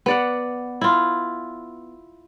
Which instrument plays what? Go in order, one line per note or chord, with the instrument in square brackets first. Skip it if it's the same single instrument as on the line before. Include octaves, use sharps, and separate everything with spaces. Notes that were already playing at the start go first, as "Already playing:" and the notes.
[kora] B3 D5 F#5
E4 F4